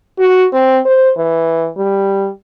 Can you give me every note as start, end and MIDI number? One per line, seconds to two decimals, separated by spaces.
0.19 0.45 66
0.53 0.79 60
0.85 1.12 72
1.17 1.69 52
1.77 2.29 55